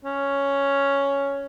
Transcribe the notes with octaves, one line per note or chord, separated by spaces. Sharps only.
C#4